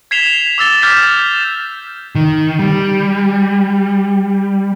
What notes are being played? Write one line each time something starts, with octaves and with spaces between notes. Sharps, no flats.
G#6 B6 C7 E7 F7 G7
D6 E6 A6 G7
D6 F6 G6 G#6 B6 E7
D#3
G3